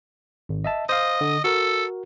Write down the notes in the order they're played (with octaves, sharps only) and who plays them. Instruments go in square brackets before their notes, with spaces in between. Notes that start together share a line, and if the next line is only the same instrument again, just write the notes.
[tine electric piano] G#1
D#5 E5 A5
[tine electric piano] C5 F5 [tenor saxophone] D#5
[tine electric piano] D3
[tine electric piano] F#4 A#4 [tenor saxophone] A4